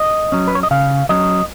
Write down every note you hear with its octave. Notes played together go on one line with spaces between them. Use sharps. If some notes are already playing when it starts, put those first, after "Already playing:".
Already playing: D#5
F#3 C#4
B4
C#5
D#5
C#3 F5
F#3 C#4 D#5